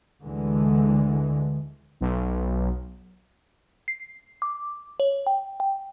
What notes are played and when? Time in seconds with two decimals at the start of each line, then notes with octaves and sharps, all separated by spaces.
0.23 D2 D3 E3 G#3
2.01 B1
3.88 C7
4.42 D6
5.00 C#5
5.27 G5
5.60 G5